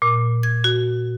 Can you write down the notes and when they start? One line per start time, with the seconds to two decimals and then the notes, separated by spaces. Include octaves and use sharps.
0.02 A#2
0.43 G#6
0.64 F#4